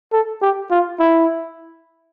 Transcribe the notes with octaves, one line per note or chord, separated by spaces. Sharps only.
A4
G4
F4
E4